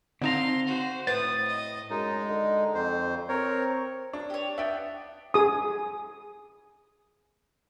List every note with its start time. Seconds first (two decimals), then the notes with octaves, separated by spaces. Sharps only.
0.22 D3 C4 D#4 A4 F5 A#5 C6
0.67 F#4 C5
1.07 A2 B4 C5 D#6 G6 A6
1.47 D#5
1.90 F#2 G#3 D#4
2.30 D3
2.74 F2 C5
3.29 C4 A#4 C#5
4.13 D4
4.30 G4 C#5
4.58 B3 D4 E5 G5
5.34 G#4 D#6